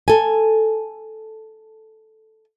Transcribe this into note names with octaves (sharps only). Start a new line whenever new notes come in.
A4 G#5